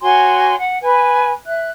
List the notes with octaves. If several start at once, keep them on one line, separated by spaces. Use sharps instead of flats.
F#4 C#5 G#5 C6
F#5
B4 G#5
E5 F#6